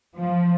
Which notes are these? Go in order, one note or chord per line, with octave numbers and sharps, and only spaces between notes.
F3